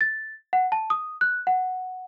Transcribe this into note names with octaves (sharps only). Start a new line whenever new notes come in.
A6
F#5
A5
D#6
F#6
F#5